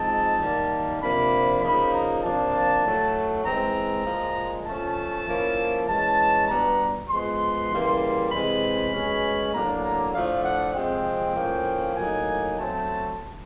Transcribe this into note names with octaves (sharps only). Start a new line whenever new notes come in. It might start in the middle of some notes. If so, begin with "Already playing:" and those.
Already playing: F3 G#3 C4 D#4 A5
D#3 G3 A#3
C3 F3 A#3 D4 B5
C#3 F3 A#3 D#4 B5
A#5
C3 F3 A#3 D4 A5
A2 F#3 A3
E3 G#3 C4 A#5
A#2 F3 G#3
F3 A3 C#4 A5
F3 A#3 C#4 E4
E3 G#3 C#4 A5
B2 G3 B3 D4 A#5
F3 G#3 B3 C6
C#3 E3 G3 A#3
C3 E3 G#3 C4 B5
B2 G#3 C#4
A2 F#3 A#3 D4 A#5
A#5
A2 F3 A3 D4 F5
F#5
C3 F3 G#3 C4 G5
A2 F3 A#3 C#4
A2 F#3 A#3 D#4 G#5
F#3 A3 C4 A5